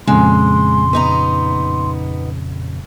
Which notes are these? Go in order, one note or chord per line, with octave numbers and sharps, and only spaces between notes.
F2 A#2 C#3 G#3 C6
B3 D#4 A#5